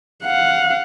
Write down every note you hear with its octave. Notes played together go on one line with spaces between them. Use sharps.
F5 F#5